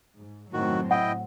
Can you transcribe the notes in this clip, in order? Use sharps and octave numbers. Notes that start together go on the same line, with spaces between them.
G#2
F#1 A2 D#3 F#3 C4 F#4
E4 D#5 F#5 G5